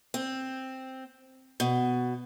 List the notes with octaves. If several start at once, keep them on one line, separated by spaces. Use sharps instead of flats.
C4
B2